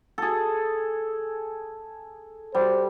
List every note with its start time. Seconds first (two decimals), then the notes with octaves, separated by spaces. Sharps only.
0.18 G#4 A4
2.55 G3 C5